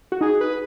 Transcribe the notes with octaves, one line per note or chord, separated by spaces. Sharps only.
F#4
D#4 G#4
B4